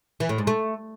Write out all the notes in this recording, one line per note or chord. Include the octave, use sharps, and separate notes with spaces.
E3
A2
G#2
A3